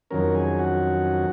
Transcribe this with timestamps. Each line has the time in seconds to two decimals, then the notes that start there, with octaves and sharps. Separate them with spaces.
0.11 F2 D#3 F#3 C#4 A#4
0.35 G#4
0.59 F#4